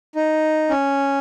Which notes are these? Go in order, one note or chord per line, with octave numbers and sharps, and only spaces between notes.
D#4
C#4